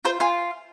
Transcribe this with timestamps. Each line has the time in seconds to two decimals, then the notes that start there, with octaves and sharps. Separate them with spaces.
0.05 F4 C5
0.20 F4 G#5